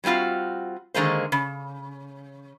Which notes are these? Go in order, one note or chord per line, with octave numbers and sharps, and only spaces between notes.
F#3 G3 C4 F4 F#4
D3 D#3 G#3 A#3 C5
C#3